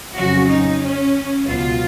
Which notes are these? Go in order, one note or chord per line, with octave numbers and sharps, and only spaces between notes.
F2 C#3 F#3 C#4 F#4
D#4
C#4
C#2 B2 F#3 B3 F4